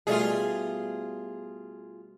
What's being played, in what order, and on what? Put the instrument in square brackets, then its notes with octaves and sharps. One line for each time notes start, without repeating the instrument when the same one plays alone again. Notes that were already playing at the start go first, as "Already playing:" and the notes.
[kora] B2 G3 A3 [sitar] F4 G#4